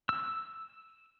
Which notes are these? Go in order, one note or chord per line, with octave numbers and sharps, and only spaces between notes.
E6